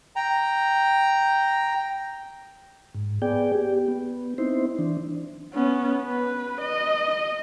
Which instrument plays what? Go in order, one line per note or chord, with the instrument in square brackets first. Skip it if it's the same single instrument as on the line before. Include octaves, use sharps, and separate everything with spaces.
[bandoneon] G5 A#5
[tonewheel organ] G#2
B3 G#4 D5 G5
G4
B3
C4 D#4 E4 C5
E3 D4
[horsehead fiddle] B3 C#4
B4
D#5